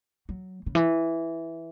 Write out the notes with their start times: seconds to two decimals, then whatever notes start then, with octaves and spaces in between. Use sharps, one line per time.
0.29 F#3
0.66 C#3
0.75 E3